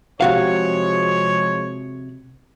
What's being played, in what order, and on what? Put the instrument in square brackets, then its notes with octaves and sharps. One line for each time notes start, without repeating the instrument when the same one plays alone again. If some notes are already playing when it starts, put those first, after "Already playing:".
[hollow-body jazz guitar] C3 F#4 F5 [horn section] F3 G#3 C#5